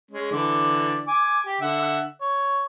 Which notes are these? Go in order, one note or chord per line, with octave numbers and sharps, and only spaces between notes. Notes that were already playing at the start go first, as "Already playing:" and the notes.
G#3 C#4
D3 E3 D5
G#5 D6
G4
D3 E5 F#5
C#5